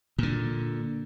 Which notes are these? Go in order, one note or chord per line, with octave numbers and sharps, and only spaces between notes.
A#2 D3